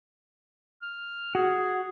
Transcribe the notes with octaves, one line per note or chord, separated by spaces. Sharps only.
F6
F#4 G#4